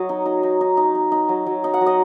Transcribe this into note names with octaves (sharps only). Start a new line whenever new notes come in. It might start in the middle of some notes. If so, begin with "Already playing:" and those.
Already playing: F#3 C#5 D#5
D#4
D#4
D#4
D#4
D#4
D#4
D#4
F#3
F#3
D#4
F#5
F#3
D#5